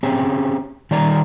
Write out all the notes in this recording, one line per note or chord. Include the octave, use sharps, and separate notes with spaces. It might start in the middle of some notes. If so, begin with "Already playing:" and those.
C4 C#4 G4 G#4
D#3 G3 D5 A#5